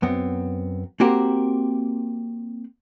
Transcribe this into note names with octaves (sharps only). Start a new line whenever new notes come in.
F#2 B3 C4
A#3 C4 F#4 G4 A#4 C5